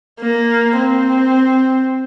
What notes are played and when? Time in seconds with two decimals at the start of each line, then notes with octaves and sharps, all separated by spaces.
0.20 A#3
0.77 C4